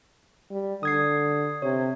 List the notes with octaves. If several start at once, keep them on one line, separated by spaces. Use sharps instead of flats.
G3
D3 D#6 G#6 C7
C3 C#5